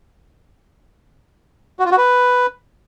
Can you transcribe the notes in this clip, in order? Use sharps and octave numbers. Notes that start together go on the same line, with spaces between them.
F#4
F4
F#4
B4